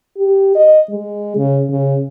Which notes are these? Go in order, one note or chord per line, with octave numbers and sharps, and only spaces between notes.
G4
D#5
G#3
C#3
C#3